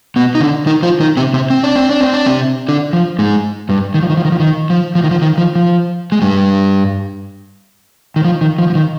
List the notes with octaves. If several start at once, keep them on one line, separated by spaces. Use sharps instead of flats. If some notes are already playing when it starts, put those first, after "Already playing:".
B2 B3
D#4
D3 D4
D#3 D#4
F3 F4
D#3 D#4
C3 C4
C3 C4
C4
D4
C4
D4
C4
D4
C3 C4
D3 D4
F3
G#2 G#3
G2 G3
D#3
F3
D#3
F3
D#3
F3
D#3
F3
F3
D#3
F3
D#3
F3
F3
G#3
G2 G3
D#3
F3
D#3
F3
F3
D#3